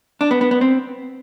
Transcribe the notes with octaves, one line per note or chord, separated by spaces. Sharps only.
D4
B3
B3
B3
C4